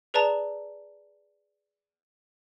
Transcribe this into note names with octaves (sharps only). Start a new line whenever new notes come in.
G#4 B4 D5 A5 A#5